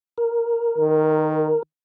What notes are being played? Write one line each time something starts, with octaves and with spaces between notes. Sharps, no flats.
A#4
D#3